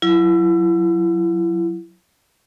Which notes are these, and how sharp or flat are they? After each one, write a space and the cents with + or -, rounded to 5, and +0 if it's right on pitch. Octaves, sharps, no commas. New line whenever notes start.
F#3 -20 E4 +30